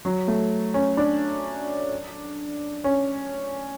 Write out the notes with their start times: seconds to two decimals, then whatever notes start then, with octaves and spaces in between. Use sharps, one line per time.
0.05 F#3
0.28 A3
0.74 C#4
0.97 D4
2.84 C#4